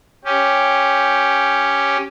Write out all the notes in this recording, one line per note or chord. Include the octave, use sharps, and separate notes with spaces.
C#4 G4